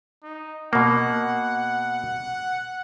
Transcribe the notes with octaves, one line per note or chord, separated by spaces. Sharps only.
D#4
B2 A#3 F#5